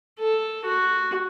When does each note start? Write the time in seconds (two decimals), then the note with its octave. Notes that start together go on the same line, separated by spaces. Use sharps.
0.20 A4
0.65 F#4